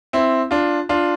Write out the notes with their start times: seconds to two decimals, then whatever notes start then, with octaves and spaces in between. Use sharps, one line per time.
0.13 C4 E4
0.51 D4 F4
0.89 D4 F4